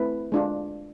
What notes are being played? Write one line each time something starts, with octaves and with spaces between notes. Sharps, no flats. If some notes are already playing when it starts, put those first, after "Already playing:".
Already playing: A3 C4 E4 B4
G#3 D4 F4